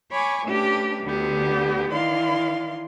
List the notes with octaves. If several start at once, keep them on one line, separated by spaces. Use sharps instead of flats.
C#5 G#5 B5 C#6 D6
A3 C#4 D4 G4 B4
D2 D3 B3 G4
D#3 E3 D5 F5 C6